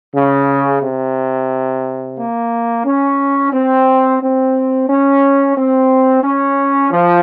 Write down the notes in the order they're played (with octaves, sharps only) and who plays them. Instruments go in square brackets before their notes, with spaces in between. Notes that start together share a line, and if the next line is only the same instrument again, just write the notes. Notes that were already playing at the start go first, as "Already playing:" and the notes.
[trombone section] C#3
C3
A#3
C#4
C4
C4
C#4
C4
C#4
F3